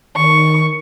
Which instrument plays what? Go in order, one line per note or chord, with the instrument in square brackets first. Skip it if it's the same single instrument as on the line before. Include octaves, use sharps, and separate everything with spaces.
[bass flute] D#3 [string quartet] C#6